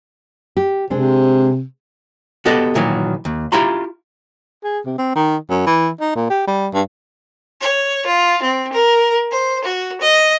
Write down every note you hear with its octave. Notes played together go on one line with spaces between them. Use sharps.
G4
C3 G#3 C4 D4
B3 F#4 G4 A4 D#5
A#2 D#3 E3 F#3
D#2
E4 F4 G4 A#5 C6
G#4
C3
C4
D#3
F#2
E3
D#4
A#2
G4
G3
G2
C#5
F4
C4
A#4
C5
F#4
D#5